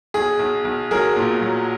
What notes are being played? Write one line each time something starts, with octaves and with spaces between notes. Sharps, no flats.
B1 G#4
B1
B1
F#3 G#4 A#4
A#2
F#3